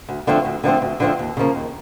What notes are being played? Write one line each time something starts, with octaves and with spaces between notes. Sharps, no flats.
D2
D3 F3 A3 C4
D2
D3 F3 A3 C4
D2
D3 F3 A3 C4
D#2
C#3 F3 A#3
D#2